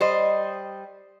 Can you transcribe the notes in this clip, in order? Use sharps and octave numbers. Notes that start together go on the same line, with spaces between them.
G3 C5 D#5